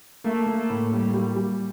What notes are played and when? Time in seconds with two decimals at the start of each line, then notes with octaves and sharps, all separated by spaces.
0.24 A3 A#3
0.47 A#3
0.58 A3
0.70 A2
0.91 G3 A#3
1.14 G3
1.36 G3